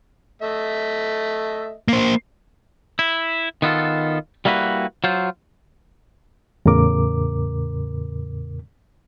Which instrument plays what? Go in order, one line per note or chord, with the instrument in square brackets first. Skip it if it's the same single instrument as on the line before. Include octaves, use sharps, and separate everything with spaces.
[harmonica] A3 D#5 E5
[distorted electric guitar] A#3 C5
[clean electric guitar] E4
D#3 B3 F4 A4
G3 A#3 E4 F#4 B4
F#3 F4 C5
[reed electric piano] E2 A2 C#3 A#4 D6